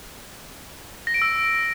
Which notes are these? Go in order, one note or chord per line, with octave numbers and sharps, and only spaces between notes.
A#6
D7
E6